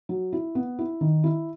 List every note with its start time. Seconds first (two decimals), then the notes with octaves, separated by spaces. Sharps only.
0.09 F#3
0.33 E4
0.55 B3
0.79 E4
1.01 D#3
1.24 E4